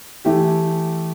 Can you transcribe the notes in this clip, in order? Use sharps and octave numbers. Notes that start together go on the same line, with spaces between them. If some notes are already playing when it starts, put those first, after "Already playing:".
E3 A3 G4